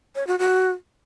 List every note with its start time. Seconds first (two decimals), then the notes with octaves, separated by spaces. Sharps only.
0.15 C#5
0.27 F#4
0.39 F#4